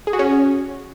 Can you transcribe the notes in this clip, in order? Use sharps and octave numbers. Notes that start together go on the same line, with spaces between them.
G#4
F#4
C#4